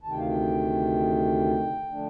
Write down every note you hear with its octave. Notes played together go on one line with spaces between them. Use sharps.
D2 C3 D#3 A5
G5
F5
G5
D3 F3 A3 D4